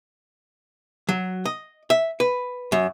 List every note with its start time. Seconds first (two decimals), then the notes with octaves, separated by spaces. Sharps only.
1.09 F#3
1.45 D#5
1.90 E5
2.20 B4
2.72 F#2